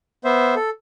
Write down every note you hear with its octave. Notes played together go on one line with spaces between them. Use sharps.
B3 C5 E5
A4